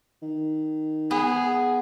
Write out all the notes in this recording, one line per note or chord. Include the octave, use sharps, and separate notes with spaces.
D#3
B3 G#4